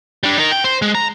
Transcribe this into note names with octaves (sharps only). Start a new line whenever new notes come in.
G3 D4
D#4 A#4
G5
C5
G#3
A#5